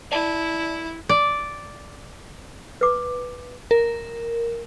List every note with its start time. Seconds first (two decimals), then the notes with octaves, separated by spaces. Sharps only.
0.12 E4 D5 A5
1.09 D5
2.81 B4 D6
3.71 A#4